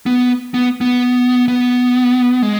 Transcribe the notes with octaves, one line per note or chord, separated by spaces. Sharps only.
B3
B3
B3
B3
G#3